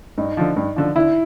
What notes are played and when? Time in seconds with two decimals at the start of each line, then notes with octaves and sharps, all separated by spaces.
0.18 G2 D#4
0.37 D3 F3
0.56 G2
0.76 D3 F3
0.96 D3 E4